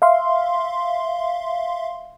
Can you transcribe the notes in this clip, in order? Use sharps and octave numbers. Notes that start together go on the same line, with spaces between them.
E5 F5 C6